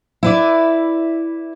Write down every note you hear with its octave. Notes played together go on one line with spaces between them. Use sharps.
E4 B4 D5